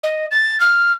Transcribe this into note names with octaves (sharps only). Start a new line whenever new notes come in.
D#5
A6
F6